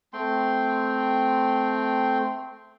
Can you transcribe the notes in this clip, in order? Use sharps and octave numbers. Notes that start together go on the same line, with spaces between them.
A3 C4 G5 C6